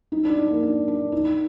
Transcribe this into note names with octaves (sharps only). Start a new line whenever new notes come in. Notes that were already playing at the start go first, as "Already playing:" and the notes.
D#4
D4
D#4
A#3
D4
D4
D#4